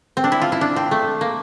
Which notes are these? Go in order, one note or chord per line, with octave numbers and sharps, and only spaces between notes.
C4
D4
E4
F4
E4
D4
C4
A3
A#3